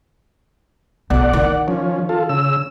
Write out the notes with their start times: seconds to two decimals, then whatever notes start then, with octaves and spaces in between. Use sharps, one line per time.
1.10 B1 D5 F#5
1.33 D#3
1.68 F3 C#4
2.09 F4 A4
2.29 C#3 E6